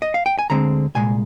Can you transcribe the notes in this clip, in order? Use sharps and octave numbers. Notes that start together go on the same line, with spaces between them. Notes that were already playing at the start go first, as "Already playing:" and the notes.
D#5
F5
G5
G#5
D2 D3 G#3 C4 A#5
C2 A#2 G#3 G#5